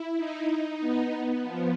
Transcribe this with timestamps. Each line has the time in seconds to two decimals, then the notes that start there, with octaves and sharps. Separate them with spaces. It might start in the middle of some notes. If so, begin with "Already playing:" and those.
Already playing: E4
0.17 D#4
0.80 B3
1.44 F3